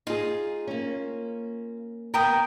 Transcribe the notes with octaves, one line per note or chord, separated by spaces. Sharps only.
D#4 F4 G#4
A#3 C#4
B3 A#4 G5 D#6